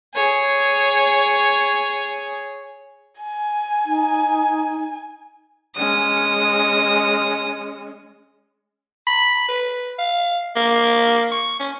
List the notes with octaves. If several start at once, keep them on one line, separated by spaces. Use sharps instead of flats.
G#4 C#5
G#5
D#4
G#3 C#4 D#6
B5
B4
F5
A#3
C#6
C#4